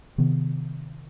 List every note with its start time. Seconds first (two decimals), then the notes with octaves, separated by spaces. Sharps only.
0.18 C3 D#3 B3